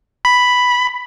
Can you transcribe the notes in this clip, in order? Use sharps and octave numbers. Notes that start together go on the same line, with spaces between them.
B5